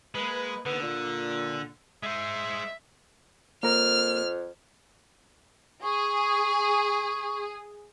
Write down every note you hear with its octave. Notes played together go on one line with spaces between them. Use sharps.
G#3 A#3 B4
D#2 D3 B3
A#2
G#3 C5 E5
F2 A#3 A#4 F6
G#4 C#6